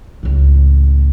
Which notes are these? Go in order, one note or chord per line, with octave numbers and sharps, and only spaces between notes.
C#2 A2